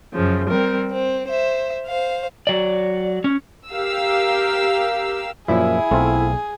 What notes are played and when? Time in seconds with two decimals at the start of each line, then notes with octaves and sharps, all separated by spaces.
0.13 F#2 C#3 F3
0.49 G3 C4 A#4
0.91 C4
1.29 C5 E5
1.85 C5 F5
2.47 F#3 D5
3.24 C#4
3.69 G4 A#4 F5 E6
5.48 F#2 A#2 F3 E4 G#4
5.91 B1 A3 C4 F4